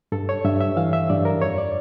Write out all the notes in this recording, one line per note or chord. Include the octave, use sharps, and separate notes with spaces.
G2 A4
C#5
G2 E5
E5
E3 F5
E5
G2 D5
A#4
F2 C#5
D5